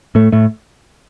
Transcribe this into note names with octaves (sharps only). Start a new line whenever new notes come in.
A2 A3
A2 A3